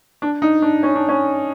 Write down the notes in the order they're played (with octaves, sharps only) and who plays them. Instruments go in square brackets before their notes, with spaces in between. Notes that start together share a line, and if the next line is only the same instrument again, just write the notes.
[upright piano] D4
D#4
D4
C#4
D4
C#4